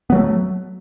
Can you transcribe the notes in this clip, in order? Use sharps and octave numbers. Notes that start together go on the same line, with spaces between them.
F#3 A3 B3